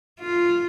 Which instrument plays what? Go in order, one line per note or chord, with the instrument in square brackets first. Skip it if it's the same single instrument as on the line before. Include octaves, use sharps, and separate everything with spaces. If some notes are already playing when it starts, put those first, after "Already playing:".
[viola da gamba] F4